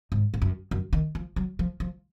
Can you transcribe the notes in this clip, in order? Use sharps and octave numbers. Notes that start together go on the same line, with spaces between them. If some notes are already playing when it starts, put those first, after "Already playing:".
G#2
G#2
F#2
F#2
D#3
F3
F#3
F3
F3